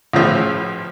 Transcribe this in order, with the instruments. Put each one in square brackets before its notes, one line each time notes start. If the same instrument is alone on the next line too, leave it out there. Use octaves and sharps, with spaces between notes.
[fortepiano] B1 A2 C#3 F3